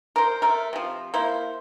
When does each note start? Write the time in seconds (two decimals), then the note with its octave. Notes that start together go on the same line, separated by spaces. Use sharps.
0.16 A#4 C5
0.42 A3 A#4
0.73 C3 F3
1.14 A#3 E4 C5